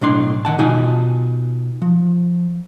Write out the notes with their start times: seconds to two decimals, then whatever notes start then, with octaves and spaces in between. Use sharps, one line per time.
0.01 B1 A2 D4 C6
0.45 D#3 F#5 A5
0.58 B2 D#4 F4 G#5
1.82 F3